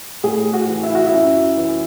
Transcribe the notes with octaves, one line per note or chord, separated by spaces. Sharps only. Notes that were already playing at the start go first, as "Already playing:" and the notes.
A2 G#4
F#4
E3
E4
F#4
E4
F#2
E3